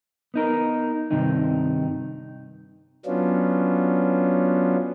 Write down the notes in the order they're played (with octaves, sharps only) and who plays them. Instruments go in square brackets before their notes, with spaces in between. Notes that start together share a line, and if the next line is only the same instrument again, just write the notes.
[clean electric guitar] B3 D#4 A#4
G2 C3 D#3 D#4
[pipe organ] F#3 B3 C#4 D4 F4